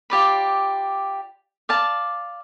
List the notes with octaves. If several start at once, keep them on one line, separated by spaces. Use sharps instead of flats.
F4 G4 D5 B5
D5 F5 A5